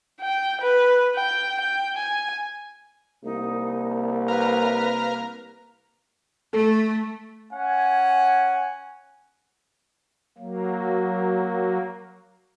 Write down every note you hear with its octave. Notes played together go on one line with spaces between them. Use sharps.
G5
B4
G5
G5
G#5
C2 A#3 D#4
A#4 B4 F5
A3 A4
C#4 F#5 G#5
F#3 A#3